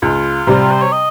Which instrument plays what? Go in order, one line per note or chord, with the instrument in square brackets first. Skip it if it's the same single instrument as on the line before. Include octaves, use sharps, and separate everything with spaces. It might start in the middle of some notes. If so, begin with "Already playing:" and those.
[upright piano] C#2 [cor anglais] F4
[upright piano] C3 G3
[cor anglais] C5
C#5
D#5